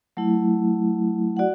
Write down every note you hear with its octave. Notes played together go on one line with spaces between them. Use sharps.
F#3 A3 E4
F#4 D5 F#5